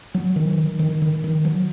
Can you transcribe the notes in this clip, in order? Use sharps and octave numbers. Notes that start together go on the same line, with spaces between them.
F#3
D#3
D#3
D#3
D#3
D#3
F#3